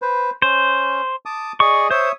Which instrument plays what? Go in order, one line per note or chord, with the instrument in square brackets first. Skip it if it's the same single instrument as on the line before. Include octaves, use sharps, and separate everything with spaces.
[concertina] B4 C5
[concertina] C#4 [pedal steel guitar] C5
[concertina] A5 D6 D#6
[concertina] G#4 D5 D#5 [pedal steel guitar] C#6
[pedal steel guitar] C5 [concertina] C#5 E5 D#6